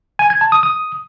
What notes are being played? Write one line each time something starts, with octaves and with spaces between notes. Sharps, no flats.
G#5
G#6
A5
D#6
D#6